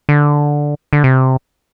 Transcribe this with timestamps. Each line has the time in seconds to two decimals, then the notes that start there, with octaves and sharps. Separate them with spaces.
0.09 D3
0.93 D3
1.04 C3